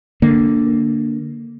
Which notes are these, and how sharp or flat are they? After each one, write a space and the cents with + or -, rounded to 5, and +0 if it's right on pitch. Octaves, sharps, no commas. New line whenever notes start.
D3 +0 A#3 +0